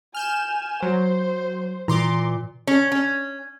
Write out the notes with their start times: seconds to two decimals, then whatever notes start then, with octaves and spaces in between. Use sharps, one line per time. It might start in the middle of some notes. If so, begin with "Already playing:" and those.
0.14 G#5 F6 G6 E7
0.83 F#3 C5
1.88 A#2 E3 A#5 C6 D6
2.67 C#4
2.92 C#4